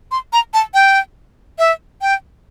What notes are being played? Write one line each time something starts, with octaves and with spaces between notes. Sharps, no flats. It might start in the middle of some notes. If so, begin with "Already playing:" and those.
C6
A#5
A5
G5
E5
G5